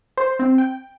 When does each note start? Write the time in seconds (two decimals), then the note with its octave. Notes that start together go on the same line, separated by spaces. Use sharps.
0.17 C5
0.39 C4
0.58 G5